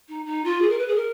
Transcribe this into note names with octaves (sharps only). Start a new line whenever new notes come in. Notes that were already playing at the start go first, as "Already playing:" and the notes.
D#4
D#4
F4
G#4
A#4
B4
G#4
A#4